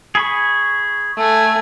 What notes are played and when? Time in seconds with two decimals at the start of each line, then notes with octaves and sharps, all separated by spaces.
0.15 G#4 B5 C#6
1.18 A3 G#5